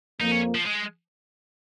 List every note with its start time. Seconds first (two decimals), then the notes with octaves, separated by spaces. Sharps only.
0.20 F2 F3 A#3 D#4
0.32 C#4
0.55 F3
0.66 G#3